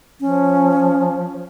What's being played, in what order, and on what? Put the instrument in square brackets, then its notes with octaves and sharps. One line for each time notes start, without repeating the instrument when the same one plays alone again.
[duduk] F3 [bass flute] C#4